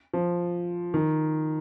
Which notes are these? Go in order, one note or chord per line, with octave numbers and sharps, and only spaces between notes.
F3
D#3